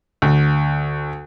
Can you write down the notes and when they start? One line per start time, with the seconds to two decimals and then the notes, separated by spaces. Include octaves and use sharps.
0.22 D2